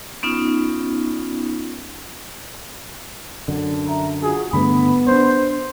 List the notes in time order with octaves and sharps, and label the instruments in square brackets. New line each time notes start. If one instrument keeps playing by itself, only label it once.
[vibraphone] B3 C#4 D#4 F4
[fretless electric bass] F#2 D3
[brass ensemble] E5 A#5
[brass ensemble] F4 F#4 [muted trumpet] G#4
[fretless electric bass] G2 D3 A3 [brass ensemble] B3 [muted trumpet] B5
[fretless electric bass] C4 D4 [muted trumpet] C5